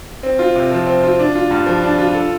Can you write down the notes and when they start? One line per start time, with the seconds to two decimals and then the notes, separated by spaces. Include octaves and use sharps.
0.23 C4
0.39 F4
0.55 C3
0.71 F3
0.87 C4
1.04 F4
1.20 D4
1.35 F4
1.51 G2
1.66 F3
1.83 D4
1.98 F4
2.14 A4